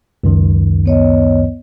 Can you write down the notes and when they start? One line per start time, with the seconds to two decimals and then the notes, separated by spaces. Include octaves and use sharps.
0.24 C#2 F#2 D#3
0.86 B3 C#5 D#5